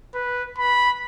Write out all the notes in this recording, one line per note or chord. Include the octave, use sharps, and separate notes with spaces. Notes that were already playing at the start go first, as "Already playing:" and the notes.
B4
B5